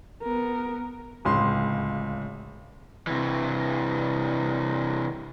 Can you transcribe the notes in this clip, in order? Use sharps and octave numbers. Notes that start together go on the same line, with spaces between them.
B3 A#4
D1 C#2 C6
C3 E3